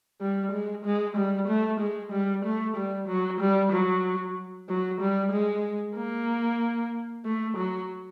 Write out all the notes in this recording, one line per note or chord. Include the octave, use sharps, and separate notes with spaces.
G3
G#3
G#3
G3
A3
G#3
G3
A3
G3
F#3
G3
F#3
F#3
G3
G#3
A#3
A3
F#3